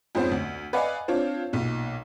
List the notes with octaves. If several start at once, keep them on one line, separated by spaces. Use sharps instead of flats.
F2 G#2 F3 B3 C#4 C5
D2
B4 D5 D#5 F5 F#5 G#5
C4 D4 F4 C#5
B1 A#2